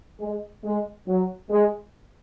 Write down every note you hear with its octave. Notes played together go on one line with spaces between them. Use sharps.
G#3
G#3
F#3
G#3